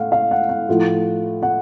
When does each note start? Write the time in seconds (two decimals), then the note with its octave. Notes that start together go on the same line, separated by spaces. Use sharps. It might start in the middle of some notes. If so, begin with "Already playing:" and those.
Already playing: A2 A3 F5 F#5
0.12 F5
0.31 F#5
0.49 F#5
0.69 A2 F3 A3
1.43 F#5